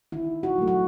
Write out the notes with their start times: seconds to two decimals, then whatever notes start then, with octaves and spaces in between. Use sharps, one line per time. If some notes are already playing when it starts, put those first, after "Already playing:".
0.12 D#3 E4
0.43 F#4
0.58 F#3 A3
0.68 F#4